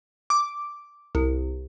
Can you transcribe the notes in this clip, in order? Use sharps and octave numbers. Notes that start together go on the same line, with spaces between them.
D6
C2